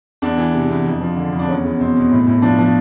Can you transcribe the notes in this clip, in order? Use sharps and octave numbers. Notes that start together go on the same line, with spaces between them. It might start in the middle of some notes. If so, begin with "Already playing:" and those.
E2 D4
E3
C3
E2
F2
F3
D3
F2
D4
E2 C#4
E2
B2 C4
B2
A2
A2
F3 D4
F3